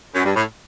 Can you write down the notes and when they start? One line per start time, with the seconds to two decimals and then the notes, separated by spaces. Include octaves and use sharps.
0.15 F#2
0.25 G2
0.36 A2